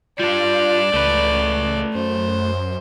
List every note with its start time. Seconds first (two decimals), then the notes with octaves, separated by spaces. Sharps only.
0.19 G3 D4 F4 D5
0.94 C#2 A3 B4
1.95 F#2 C5